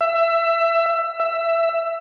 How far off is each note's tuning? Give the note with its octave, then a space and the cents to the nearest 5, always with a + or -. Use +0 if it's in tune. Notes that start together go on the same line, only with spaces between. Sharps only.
E5 +20
E5 +15